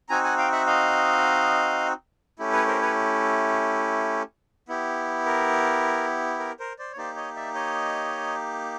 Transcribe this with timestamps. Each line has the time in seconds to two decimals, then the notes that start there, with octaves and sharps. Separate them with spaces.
0.09 C4 D#4 F#4 G#5 A#5
0.24 F#5 G#5
0.38 F5 G5
0.52 E5 F#5
0.67 D#5 F5
2.39 A3 C#4 E4 G4
2.53 B4 C#5
2.68 A#4 C5
2.82 B4 C#5
4.69 B3 E4 G4
5.26 A#4
6.39 A#4
6.59 A#4 C5
6.79 C5 D5
6.93 C#5
6.97 A#3 D#4 G4 C5 D5
7.16 C#5 D#5
7.36 D5 E5
7.55 C#5 D#5